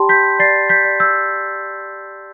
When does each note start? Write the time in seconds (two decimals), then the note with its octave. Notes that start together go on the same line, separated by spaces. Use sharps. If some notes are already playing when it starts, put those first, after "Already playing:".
Already playing: G4 D5 G5 A5 B5 C6
0.09 G6 B6
0.39 D5 A6 C7
0.69 G6 B6
0.85 D5
1.00 E6 G6